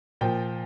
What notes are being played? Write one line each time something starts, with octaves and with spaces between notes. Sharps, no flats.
A#2 F3 G5